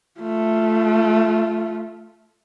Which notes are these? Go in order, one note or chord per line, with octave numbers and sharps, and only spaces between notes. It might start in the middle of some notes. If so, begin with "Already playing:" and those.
A3 F4